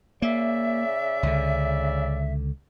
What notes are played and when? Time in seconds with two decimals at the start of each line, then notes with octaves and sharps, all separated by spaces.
0.22 C#3 A#3 D5 E5
1.23 C#2 D3